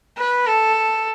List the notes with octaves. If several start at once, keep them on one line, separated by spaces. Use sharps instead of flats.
B4
A4